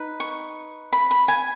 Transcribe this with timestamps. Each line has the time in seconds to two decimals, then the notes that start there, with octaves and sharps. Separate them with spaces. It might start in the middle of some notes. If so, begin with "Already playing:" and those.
Already playing: D#4 B4
0.20 C#6
0.93 B5
1.11 B5
1.28 G#5